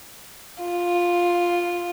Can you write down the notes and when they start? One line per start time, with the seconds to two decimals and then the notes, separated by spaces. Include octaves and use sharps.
0.63 F4